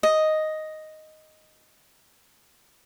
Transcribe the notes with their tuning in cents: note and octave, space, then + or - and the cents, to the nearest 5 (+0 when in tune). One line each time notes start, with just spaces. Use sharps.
D#5 +0